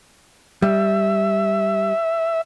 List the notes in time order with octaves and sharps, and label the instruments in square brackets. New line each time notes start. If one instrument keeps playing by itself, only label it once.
[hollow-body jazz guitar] G3 [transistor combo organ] E5